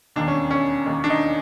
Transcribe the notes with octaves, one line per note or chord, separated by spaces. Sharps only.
E1 D#2 D#3 D4
C#4
C#4
E1 D#2 D#3
D4
D#4